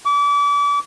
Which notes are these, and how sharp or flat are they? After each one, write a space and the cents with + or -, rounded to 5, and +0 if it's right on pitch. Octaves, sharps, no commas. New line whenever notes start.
D6 -35